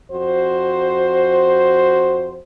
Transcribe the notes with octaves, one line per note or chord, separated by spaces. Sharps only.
F2 F#4 C5